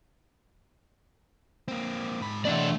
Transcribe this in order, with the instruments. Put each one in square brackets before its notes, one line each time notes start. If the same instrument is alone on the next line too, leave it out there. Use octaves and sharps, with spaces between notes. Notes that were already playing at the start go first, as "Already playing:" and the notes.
[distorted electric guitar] A#3 C4
G#2 B5
[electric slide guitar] E3 D4 D5 [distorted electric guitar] A3 E5